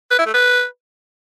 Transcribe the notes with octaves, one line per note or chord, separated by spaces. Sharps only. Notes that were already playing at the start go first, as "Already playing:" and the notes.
B4
E4
A3
B4